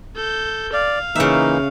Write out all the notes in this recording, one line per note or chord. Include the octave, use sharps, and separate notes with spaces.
A4 G6
D5 F5
C#3 E3 A#3 D#4 E5